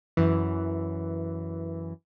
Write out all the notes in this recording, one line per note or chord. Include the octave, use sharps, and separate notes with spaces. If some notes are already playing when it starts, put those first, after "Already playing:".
F#2 E3